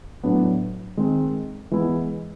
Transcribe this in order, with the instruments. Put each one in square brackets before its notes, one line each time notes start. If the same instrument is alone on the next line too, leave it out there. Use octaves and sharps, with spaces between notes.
[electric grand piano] A2 F#3 B3 D4
D#3 G#3 C4
E3 G#3 B3 E4